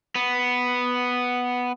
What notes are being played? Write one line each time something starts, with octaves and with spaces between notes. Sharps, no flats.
B3